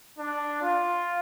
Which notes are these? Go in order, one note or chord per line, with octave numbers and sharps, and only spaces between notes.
D4
F4